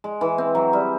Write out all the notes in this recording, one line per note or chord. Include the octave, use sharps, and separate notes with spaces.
G#3
E3
C4
F#3
G3